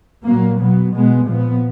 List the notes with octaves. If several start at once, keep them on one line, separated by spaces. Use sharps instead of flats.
A#2 F#3 A#3
B2 F#3 B3
B2 G#3 B3
A#2 F3 B3